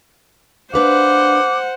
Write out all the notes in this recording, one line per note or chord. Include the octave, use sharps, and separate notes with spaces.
D4 B4 C5 F5 F#5 D6